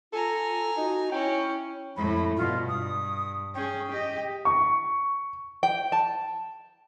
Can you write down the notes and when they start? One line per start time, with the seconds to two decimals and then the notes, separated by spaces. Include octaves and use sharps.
0.13 F4 A4 G#5 A#5
0.77 D#4 F#4
1.12 C#4 E4 G5
1.97 F2 A2 B5
2.37 G2 B2 F4
2.69 G2 D#6
3.55 C#4 G#4 G5
3.91 G4 D#5
4.45 C#6
5.63 G5
5.92 A5